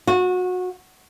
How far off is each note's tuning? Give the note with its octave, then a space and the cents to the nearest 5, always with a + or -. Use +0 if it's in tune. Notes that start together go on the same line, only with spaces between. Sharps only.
F#4 -25